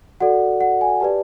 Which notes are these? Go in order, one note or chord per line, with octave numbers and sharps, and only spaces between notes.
F#4 A4 D5 F#5
F#5
G#5
G4 B4 D5 A5